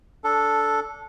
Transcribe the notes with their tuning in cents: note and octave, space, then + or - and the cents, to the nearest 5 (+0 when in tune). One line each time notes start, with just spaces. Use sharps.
D4 -15 A4 +0